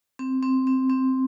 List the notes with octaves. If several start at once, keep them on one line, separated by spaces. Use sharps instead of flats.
C4
C4
C4
C4